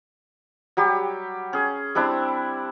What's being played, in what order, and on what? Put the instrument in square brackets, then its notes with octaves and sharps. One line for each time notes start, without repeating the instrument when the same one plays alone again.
[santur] F#3 G3 G4
C#4 G#4
G3 C4 D4 E4